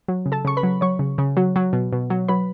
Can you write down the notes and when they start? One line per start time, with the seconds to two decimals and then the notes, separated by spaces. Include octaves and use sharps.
0.08 F#3
0.26 C#3
0.32 A4 A5
0.45 C#3 C#6
0.57 B4 B5
0.63 F#3
0.81 F#3 C#5 C#6
0.99 C#3
1.18 C#3
1.37 F#3
1.56 F#3
1.73 B2
1.93 B2
2.10 F#3
2.28 F#3 B4 B5